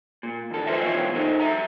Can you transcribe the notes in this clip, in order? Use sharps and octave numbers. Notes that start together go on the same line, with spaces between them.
A#2
D#2 A4
F4 B4 C5 D#5 E5
B1 E3 B3 F4 C5 C#5
D#4 A4 C5 D#5
G2 D#3 E5 A#5